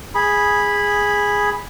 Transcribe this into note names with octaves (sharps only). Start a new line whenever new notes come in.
G#4 B5